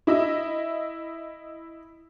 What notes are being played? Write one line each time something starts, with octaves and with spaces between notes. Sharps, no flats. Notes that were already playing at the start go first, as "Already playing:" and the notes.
E4 D#5 E5